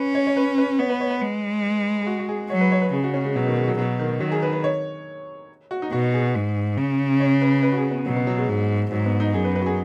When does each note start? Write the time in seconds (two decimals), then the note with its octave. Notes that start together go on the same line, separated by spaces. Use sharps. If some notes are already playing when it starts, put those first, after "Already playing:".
Already playing: C#4 B4
0.15 C#5
0.27 C#5
0.37 B4
0.58 B4
0.79 B3 C#5
0.90 B4
1.01 C#5
1.10 B4
1.21 G#3
2.01 G#4
2.07 F#4
2.19 F#4
2.29 G#4
2.50 F#3 C#5
2.61 B4
2.72 C#5
2.82 B4
2.93 C#3 G#4
3.04 F#4
3.14 C#4
3.25 G#3
3.35 B2 F#3
3.46 D#3
3.57 G#3
3.68 F#3
3.78 B2 F#3
3.99 D#3
4.20 D#3 F#3
4.32 G#4
4.43 B4
4.53 B4
4.64 C#5
5.71 F#4
5.82 D#4
5.92 B2 F#4
6.14 G#4
6.35 G#2
6.77 C#3
7.20 C#5
7.41 B4
7.63 B4
7.72 F#4
7.77 G#4
7.91 B3
8.06 B2 F#3
8.16 B3
8.27 F#3
8.37 G#3
8.49 G#2
8.91 G#2 F#3
9.06 B3
9.20 D#4
9.34 F#2 G#4
9.44 B4
9.56 B4
9.61 F#4
9.66 G#4